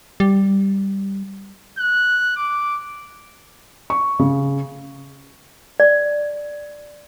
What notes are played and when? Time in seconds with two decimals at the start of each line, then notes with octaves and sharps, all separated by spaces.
0.20 G3
1.78 F#6
2.36 D6
3.90 C#6
4.19 C#3
5.80 D5